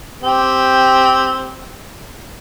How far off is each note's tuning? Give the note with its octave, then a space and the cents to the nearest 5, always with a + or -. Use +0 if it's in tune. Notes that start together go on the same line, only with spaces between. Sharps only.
C4 +0 G4 +0